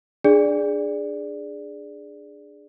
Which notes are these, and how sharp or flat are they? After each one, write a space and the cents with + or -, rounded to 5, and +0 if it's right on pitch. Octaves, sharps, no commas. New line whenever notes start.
D4 +15 G#4 +0 D5 +0